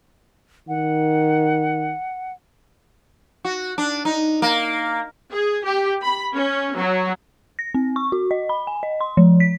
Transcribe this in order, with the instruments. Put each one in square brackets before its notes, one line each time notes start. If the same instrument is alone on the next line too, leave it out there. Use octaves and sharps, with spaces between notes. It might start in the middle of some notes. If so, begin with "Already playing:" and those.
[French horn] D#3 [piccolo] F#5
[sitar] F#4
D4
D#4
A#3
[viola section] G#4
G4
B5
C#4
F#3
[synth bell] A#6
C4
C#6
F#4
D#5
B5
G#5
D#5
C6
F3
B6